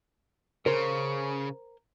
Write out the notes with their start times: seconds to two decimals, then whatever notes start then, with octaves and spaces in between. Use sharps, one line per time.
0.66 C#3 A#4 C5